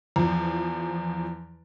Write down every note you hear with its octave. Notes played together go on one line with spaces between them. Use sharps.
E2 F3